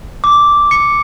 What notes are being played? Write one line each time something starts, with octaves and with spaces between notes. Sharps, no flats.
D6
C#7